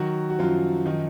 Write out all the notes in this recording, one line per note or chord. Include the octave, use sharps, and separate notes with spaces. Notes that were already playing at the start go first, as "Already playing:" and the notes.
Already playing: D#3 F#3 F#4
F#4
F#2 F3 F4
D#3 F3 D#4